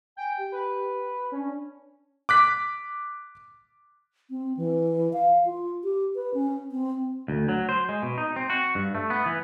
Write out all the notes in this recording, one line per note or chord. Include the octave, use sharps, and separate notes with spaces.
G5 G#5
G4
B4
C#4 D4
D6 F#6 B6
C4
E3
F5
F4
G4
B4
C#4
C4
D2
F#3
C5
G#3
B2
D#4
C4
F#4
G2
A3
B3
E3